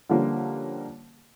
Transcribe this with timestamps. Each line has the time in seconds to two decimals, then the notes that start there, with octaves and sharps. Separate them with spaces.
0.10 D3 F3 G3 A#3 C#4